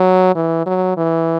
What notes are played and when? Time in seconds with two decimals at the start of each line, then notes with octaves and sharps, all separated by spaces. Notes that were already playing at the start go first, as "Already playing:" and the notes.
Already playing: F#3
0.35 E3
0.66 F#3
0.97 E3